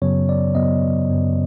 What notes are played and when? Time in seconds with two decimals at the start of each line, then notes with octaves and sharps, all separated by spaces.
0.02 F#2 C#3 F#3 B3 C#5
0.29 D5
0.55 F#2 C#3 F#3 B3 D#5
1.09 F#2 C#3 F#3 B3